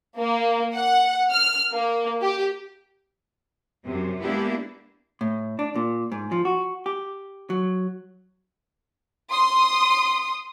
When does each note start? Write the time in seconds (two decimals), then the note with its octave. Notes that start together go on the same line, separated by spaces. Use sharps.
0.18 A#3
0.75 F#5
1.31 F6
1.73 A#3
2.22 G4
3.85 F#2 C3
4.22 G#3 A#3 B3 D4 E4 G4
5.21 A2
5.59 D4
5.76 A#2
6.12 G#2
6.32 F3
6.45 F#4
6.86 G4
7.50 F#3
9.30 C6 D#6